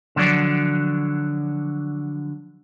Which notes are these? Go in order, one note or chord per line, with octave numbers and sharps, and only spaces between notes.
D3 F3 F#3 D5